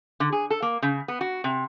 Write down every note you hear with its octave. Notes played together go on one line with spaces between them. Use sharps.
D3
G#4
A4
A#3
C#3
B3
F#4
C3